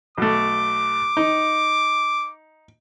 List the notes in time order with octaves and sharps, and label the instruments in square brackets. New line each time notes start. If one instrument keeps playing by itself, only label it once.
[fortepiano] B1 A3 [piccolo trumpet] D6
[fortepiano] D#4